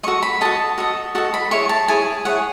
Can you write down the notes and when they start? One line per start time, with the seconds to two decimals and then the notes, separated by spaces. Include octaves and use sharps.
0.03 F#4 A4 D#5 C#6
0.23 B5
0.41 F#4 A4 D#5 A5
0.78 F#4 A4 D#5
1.15 F#4 A4 D#5 A5
1.34 B5
1.51 E4 G#4 C#5 C#6
1.69 A5
1.88 E4 G#4 C#5 G#5
2.25 E4 G#4 C#5 F#5